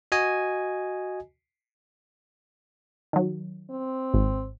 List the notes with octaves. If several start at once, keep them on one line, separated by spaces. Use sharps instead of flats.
F#4 D#5 G#5
D#3 F#3
C4
G#1